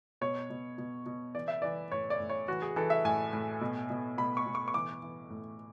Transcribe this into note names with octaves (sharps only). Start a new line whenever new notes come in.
B2 C#5
B2
B2
B2
E3 D5
E5
E3 D5
A2 C#5
D5
A2
C#5
E3 F#4
G#4
E3 A4
E5
A2 G#5
A2
B2
B2
B2 B5
C#6
B2
C#6
C#6
E3 D6
E3
A2